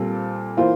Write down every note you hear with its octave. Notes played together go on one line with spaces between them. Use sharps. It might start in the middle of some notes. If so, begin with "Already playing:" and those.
Already playing: A#2 G3 C4 F4 A4
E3 A#3 F4 C5